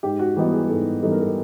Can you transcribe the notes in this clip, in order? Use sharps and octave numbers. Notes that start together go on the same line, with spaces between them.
G#2 G4
F#4
E3 G3 B3 D#4 G4
G#4
G#4
G#2 A4
E3 G3 B3 D#4 A4
A#4
A4